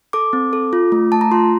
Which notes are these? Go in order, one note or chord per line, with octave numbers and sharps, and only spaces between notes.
A4 D6
C4
A4
F4
A3
A3 A5
A#5
F4 C6